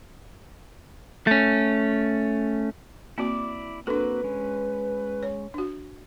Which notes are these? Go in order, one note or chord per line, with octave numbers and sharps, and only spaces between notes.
A3 C#4
A#3 C4 E4 F#4 D5 D6
A#3 C4 D4 F#4 A4 B4
G#3 C#4
C#5
D4 F#4